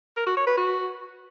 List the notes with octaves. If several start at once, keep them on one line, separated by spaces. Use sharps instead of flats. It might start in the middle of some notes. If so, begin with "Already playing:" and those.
A#4
F#4
C#5
B4
F#4